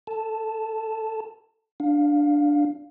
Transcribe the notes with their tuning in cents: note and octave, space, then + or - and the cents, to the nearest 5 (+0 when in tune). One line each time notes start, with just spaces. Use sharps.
A4 +10 A5 +0
D4 +0 F5 +15